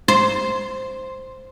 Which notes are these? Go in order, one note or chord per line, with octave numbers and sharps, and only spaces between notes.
C5